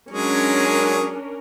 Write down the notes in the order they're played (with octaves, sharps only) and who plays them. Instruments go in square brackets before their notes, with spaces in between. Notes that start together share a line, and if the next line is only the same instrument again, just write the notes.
[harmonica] F#3 G#3 G#4 [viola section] C#4 D4 A#4